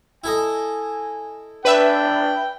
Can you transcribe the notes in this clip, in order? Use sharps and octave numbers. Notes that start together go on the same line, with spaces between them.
E4 A4 D#5 G#5
D4 B4 E5 G5